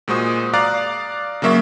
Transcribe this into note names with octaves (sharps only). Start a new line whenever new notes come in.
A#2 G#3 F#4 C5 D#6
D5 F5 A#5 D6 F#6 A6
C#3 F#3 A#3 E5 C#6